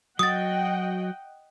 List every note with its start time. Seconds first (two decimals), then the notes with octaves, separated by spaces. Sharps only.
0.19 F#3 F#4 D#5 F#5 G5 D#6 A6